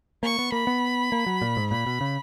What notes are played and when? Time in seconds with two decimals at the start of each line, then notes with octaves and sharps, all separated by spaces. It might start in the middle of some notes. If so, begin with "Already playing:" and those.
0.23 A#3 C#6
0.39 B3
0.52 A#3 B5
0.67 B3
1.12 A#3
1.26 F#3
1.42 A#2
1.57 G#2
1.71 A#2 B5
1.86 B2
2.01 C#3